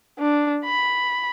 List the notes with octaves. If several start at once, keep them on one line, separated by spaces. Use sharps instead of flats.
D4
B5